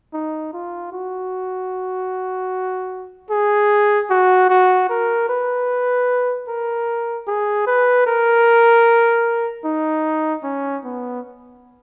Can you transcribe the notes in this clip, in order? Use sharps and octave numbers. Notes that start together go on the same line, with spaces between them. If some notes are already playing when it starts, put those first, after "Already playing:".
D#4
F4
F#4
G#4
F#4
F#4
A#4
B4
A#4
G#4
B4
A#4
D#4
C#4
B3